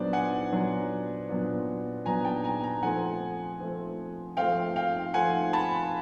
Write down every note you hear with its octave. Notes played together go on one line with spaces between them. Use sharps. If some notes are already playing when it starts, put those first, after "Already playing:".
Already playing: A#2 F#3 B3 D4 C5 D5
F#5 G#5
A#2 F#3 B3 D4
A#2 F#3 B3 D4
A#2 F#3 B3 D4 G#5 A#5
G5 A5
G#5 A#5
G#5 A#5
F3 A3 C4 F#5 G#5
F3 A3 C4
F3 A3 C4 F5 G5
F5 G5
F3 A3 C4 F#5 G#5
A5 B5